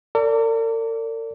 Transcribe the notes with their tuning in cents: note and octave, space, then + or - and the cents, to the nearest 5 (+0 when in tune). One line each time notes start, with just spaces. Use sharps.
A#4 -45 D5 -25